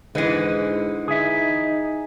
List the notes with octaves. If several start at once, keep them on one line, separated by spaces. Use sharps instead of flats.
G#2 D3 E3 G#3 B4
D#4 G#4 E5